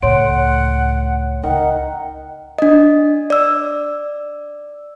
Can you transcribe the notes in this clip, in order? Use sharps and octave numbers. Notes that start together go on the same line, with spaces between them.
C#2 A2 C#5 F#5 C6 D7
C#2 D#3 F#5
D4 D#5
D5 E6